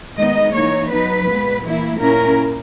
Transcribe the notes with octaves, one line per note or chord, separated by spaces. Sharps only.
D#3 G#3 B3 D#4 D#5
E3 A#3 D#4 C#5
F#3 B3 D#4 B4
A#2 G#3 B3
E3 A#3 E4
A#2 A#3 C#4 E4 A#4